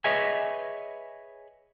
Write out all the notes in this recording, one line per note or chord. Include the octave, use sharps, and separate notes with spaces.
G#4 B4 C#5 D#5 E5 G#5